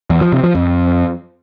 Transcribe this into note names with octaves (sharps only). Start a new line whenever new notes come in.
E2
F3
C3
F3
F2